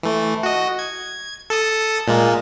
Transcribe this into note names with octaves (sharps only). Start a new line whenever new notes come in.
E3 A3
F#4 D#5
G#6
A4 A5 D#6
A#2 G#3 A#3